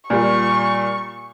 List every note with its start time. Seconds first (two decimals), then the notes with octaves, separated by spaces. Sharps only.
0.10 A#2 G3 F4 C#6